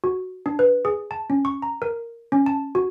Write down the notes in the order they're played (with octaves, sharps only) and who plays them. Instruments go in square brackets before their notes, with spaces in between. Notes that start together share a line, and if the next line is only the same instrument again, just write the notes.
[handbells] F#4
D4
B4
G#4
A5
C#4
C#6
A#5
A#4
C#4
A5
F#4